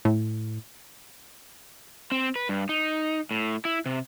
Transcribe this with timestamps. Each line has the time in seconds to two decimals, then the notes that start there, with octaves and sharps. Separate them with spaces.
0.05 A2
2.12 C4
2.36 B4
2.49 G2
2.69 D#4
3.31 A2
3.65 E4
3.86 C3